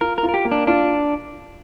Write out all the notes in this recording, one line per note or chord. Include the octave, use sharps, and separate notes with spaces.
F4 A#4
A#4
F4
A#4
G4
A#3
D4
D4 F4